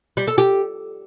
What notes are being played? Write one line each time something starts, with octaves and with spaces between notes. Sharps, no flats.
G3
A4
G4